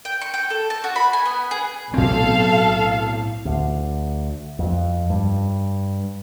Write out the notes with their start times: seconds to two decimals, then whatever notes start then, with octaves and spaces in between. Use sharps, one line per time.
0.05 G5
0.21 C#6
0.34 G5
0.50 A4
0.70 A5
0.84 F#4
0.96 B5
1.13 G#5
1.26 B3
1.51 G#4
1.94 B1 A2 C4 A4 F5
3.45 D2
4.59 F2
5.10 G2